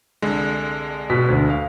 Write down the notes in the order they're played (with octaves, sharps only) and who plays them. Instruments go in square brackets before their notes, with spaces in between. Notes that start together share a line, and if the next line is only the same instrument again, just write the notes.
[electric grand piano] C2 D3 G#3
[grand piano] B2 B6
D2
F5